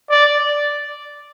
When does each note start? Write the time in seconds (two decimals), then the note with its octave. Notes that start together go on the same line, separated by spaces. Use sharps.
0.10 D5